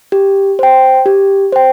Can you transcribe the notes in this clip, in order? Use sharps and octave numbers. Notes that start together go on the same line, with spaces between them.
G4
C5 G5
G4
C5 G5